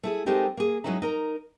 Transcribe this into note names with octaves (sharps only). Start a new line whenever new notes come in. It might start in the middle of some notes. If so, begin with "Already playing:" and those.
A3 E4 G#4
G#3 A3 C4 D#4 G4 A#4
A#3 G#4
F#3 G#3 C#4 D#4 E4
D#4 A#4 A#5